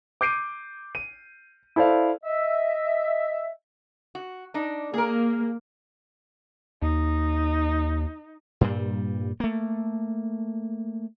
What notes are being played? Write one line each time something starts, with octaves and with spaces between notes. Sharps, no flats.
D6 G6 C7 D7 D#7
D#7
E4 A4 C5 D5 F5
D#5 E5
F#4
D4 D#4
A#3 G#4 A#4
D#2 D#4
G2 A#2 G3
A3 A#3